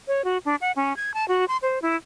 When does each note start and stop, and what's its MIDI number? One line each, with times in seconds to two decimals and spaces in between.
0.08 0.24 73
0.25 0.38 66
0.45 0.56 62
0.61 0.72 78
0.76 0.95 61
0.97 1.14 92
1.14 1.27 81
1.28 1.45 66
1.48 1.57 84
1.62 1.81 72
1.82 1.96 64